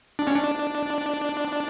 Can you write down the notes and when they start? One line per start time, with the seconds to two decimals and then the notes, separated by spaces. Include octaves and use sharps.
0.19 D4
0.27 C#4
0.36 D4